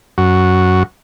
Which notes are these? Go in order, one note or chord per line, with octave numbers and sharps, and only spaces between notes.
F#2 F#4